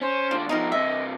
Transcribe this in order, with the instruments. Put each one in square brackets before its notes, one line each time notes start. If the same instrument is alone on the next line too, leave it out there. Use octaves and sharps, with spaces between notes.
[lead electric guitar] C#4 [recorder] C5
[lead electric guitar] D#2 D4 [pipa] F4
[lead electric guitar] B2 F3 [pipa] D#4 E4 A#4 [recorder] D#5
[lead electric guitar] G2 C3 [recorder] D#5 [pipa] E5